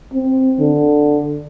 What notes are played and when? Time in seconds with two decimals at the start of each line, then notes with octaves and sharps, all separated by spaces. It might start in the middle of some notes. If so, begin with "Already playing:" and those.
0.14 C4
0.59 D3